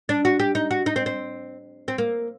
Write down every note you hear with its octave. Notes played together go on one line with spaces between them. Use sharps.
D4
F#4
G4
D#4
F#4
D#4
C4
C4
C4
A#3